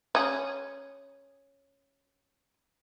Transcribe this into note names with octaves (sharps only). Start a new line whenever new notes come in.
C#4 G#4